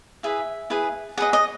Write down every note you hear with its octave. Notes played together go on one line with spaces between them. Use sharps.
E4 G#4 B4 E5
E4 G#4 B4
G#4 B4 D#5 F#5
D#5